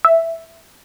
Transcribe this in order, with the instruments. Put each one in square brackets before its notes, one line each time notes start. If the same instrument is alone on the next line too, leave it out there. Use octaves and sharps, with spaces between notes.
[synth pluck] E5